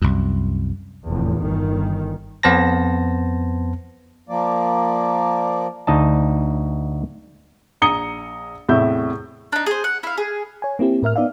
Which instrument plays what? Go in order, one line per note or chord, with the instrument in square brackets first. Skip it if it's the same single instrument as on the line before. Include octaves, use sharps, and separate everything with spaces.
[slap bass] C2 F#2
[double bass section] F1 E2 A2
G1 D#3
[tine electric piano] F2 B3 C5 A5 A#6
[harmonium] F3 A#3 D5
[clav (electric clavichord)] D2 D#4 D#5 A5
[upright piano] A#1 A#5 D#6 C#7 G7
E2 A2 C3 E4 E5 G6
[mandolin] D4 D#4
G#4 C5
F#5
E4 F5
G#4
[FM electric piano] C#5 G#5
A#3 C4 E4 G4
A2 A#4 E5 F6
B3 D#4 D5 E5 F5